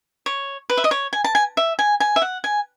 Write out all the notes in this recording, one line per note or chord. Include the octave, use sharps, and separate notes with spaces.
C#5
B4
E5
D#5
C#5
G#5
A5
G#5
E5
G#5
G#5
E5
F#5
G#5